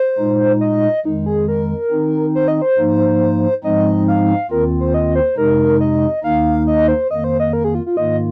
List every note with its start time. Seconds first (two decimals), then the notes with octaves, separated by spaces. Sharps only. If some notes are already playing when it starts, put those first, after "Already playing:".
Already playing: C5
0.18 A#2 G#3 D#4
0.61 D#5
1.05 F2 D#3 G#3 D#4
1.26 G#4
1.48 A#4
1.91 D#3 C4 D#4
2.35 C5
2.48 D#5
2.62 C5
2.78 G#2 F3 A#3 D#4
3.64 G#2 F3 G#3 C4 D#4 D#5
4.08 F5
4.51 D#2 D#3 C4 F4 A#4
4.80 C5
4.94 D#5
5.15 C5
5.37 F2 C3 G#3 D#4 A#4
5.81 D#5
6.23 D#2 D#3 A#3 D#4 F5
6.67 D#5
6.88 C5
7.10 F2 D#3 A#3 D#5
7.24 C5
7.40 D#5
7.53 A#4
7.64 G#4
7.75 F4
7.86 F4
7.97 G#2 D#3 A#3 F4 D#5